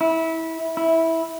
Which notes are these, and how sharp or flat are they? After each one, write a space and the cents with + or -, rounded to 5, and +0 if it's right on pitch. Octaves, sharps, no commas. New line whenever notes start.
E4 -20
E4 -10